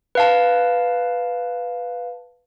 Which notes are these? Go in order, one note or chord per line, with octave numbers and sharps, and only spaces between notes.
B4 F5 A5